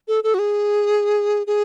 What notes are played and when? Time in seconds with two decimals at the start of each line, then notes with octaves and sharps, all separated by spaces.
0.08 A4
0.24 A4
0.34 F#4
0.39 G#4
1.47 G#4